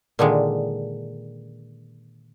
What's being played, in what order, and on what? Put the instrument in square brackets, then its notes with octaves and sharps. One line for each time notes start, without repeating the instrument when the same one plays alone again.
[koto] A#2 D3 D#3 G#3